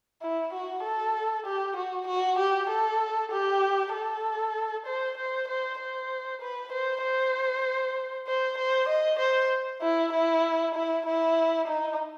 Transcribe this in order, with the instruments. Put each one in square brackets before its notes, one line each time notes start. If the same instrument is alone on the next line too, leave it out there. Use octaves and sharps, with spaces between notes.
[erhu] E4
F#4
A4
G4
F#4
F#4
G4
A4
G4
A4
C5
C5
C5
C5
B4
C5
C5
C5
C5
D#5
C5
E4
E4
E4
E4
D#4